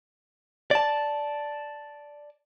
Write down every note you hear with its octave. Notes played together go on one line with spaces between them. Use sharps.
D5 A5